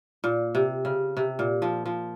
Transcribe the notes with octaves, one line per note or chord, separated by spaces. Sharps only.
A#2
C3
C#3
C3
A#2
F3
F3